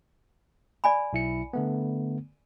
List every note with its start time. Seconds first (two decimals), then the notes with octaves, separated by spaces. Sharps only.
0.84 D5 G#5 B5
1.13 B1 E4 C#7
1.53 D3 A3 B3